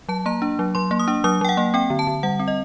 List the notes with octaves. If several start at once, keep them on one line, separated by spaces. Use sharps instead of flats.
F#3 A5
A#3 A#5
D4
F#3
F#3 C6
A#3
D#6
D4
F#3 D#6
F#3 G5
F#5
A#3
C4 G5
D3
A5
D3
G3 F#5
C4
D#5